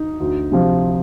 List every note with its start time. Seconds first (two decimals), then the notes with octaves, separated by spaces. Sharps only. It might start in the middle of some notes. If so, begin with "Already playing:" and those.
Already playing: D#4
0.20 D2
0.52 C3 F3